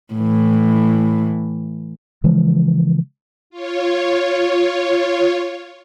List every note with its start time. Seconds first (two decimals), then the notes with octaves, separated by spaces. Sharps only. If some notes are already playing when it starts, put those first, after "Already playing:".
0.14 A2 E3
2.24 C#3 E3 F3 G#3
3.50 F4 C#5